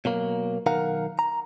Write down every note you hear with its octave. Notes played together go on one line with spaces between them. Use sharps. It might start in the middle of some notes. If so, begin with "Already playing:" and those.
B2 F#3 A#3
B1 D#3 A#4 F5 F#5 A#5
A#5